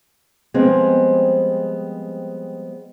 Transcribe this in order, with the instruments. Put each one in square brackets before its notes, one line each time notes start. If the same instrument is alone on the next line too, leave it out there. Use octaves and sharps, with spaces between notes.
[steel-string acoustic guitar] F3 G3 G#3 B3 C4 G#4